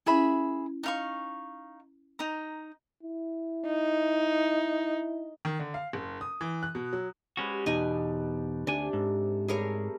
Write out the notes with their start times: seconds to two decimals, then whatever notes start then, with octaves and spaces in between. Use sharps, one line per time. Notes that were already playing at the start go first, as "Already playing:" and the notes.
0.06 C#4 E4 G#4 E5 B5
0.83 D#4 F5 C#6
2.19 D#4 A#5
3.03 E4
3.66 D#4
5.45 D#3
5.59 D3
5.74 F5
5.93 F#1
6.21 D#6
6.41 E3
6.63 F#6
6.75 B2
6.93 F#3
7.37 G#3 C#4 F#4 G4 B4 C5
7.66 E2 B2 D4 D#4 G#5
8.67 D2 C3 D4 G#5
8.93 G#2 A4
9.48 G3 A3 G#4 A#4 C#5